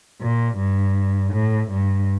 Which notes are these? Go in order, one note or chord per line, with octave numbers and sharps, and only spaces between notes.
A#2
G2
A2
G2